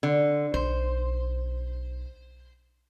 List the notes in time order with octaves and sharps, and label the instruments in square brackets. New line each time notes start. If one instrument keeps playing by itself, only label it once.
[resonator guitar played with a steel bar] D3
[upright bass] B1 [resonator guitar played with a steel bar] C5